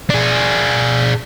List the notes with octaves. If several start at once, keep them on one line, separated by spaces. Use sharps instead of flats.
D4 G#4